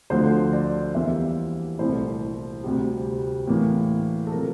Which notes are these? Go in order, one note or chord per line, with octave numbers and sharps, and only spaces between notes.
D2 D3 F3 A3 C5
D5
E2 E3 G3 A#3 E5
C2 A#2 A3 E4 C5
D2 C3 G3
A2 E3 A#3
A4
C3 F3 A#4